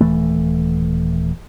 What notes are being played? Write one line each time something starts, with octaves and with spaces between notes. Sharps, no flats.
D#1 E3 A3